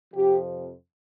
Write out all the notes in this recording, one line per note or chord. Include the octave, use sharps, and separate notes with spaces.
F2 C3 F3 G4